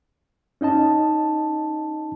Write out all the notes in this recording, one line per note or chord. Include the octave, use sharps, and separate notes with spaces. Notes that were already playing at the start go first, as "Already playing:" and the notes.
C#4 D#4 D#5 A5